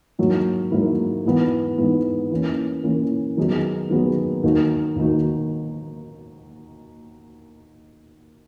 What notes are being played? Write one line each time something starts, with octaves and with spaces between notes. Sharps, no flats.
G#2 F#3 A#3 E4
G#2 F#3 A#3 E4
G#2 E3 B3
G#2 E3 B3
E3 A#3 C#4
E3 A#3 C#4
D#3 F#3 B3 D#4 G#4
D#3 F#3 B3 D#4 G#4
D#2 D#3 A#3 D#4 F#4
D#2 D#3 A#3 D#4 F#4